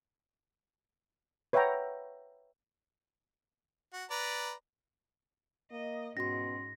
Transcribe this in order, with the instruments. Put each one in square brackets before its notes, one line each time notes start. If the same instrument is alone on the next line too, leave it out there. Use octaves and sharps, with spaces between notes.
[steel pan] B4 C#5 E5 F#5 G5 A#5
[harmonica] F#4
B4 D5 A#5
[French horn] A#3 [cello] D#5
[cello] G#2 [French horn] B2 [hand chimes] C#4 F#4 C6 [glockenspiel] A#6